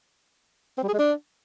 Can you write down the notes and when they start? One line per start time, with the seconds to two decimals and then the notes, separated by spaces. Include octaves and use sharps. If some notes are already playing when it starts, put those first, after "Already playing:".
0.78 C4
0.83 G3
0.88 G#4
0.93 G#3
0.99 D4